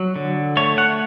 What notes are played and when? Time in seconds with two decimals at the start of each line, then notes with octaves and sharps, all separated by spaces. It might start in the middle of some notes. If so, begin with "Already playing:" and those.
Already playing: F#3
0.16 D3
0.57 A3 C#5
0.78 F#5